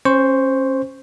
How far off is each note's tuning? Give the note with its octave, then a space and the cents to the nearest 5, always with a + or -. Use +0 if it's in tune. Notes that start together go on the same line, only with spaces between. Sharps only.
C#4 -30 C5 +0 C#6 +0